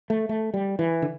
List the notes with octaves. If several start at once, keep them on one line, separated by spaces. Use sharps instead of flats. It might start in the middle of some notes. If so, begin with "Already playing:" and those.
A3
A3
G3
E3
D3